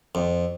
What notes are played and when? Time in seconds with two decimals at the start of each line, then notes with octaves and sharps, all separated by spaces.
0.15 F2